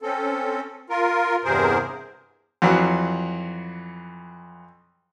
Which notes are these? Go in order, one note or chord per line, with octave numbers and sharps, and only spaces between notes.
C4 C#4 A4
F4 A#4
E2 G2 C3 G#4 A#4 C5
F2 E3 F#3